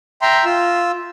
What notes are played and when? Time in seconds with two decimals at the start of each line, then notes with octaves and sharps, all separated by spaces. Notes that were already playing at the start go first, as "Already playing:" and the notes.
0.22 E5 G5 A#5 C6
0.45 F4 E6